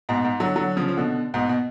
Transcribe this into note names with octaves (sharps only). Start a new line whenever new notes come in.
G#2 B2
G#2
D3 F#3
D3 F#3
C#3 F3
F3
B2 D3
G#2 B2
B2